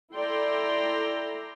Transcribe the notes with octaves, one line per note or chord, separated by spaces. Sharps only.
E4 A4 D5 G5 A#5 C6